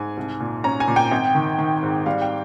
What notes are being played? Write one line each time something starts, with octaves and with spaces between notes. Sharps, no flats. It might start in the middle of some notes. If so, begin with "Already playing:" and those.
Already playing: G#2 G#5
C2
A#2
C#4 A#5
G#5
A#2
G5
G#1
D#3
D#3
G#2
G3 F5
G5